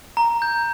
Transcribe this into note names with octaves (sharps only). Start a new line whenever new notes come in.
A#5
G6